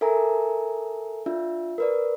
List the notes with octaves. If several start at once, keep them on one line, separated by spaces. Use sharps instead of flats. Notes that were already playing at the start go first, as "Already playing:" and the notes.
A4 A#4 E5 G#5 A#5
D4 F4 E5
A#4 B4 D5